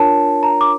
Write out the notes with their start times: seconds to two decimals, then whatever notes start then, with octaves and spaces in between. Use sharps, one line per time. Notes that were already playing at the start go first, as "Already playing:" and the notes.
Already playing: D4 F4 A#4 C#5 A5
0.43 A#5
0.61 D6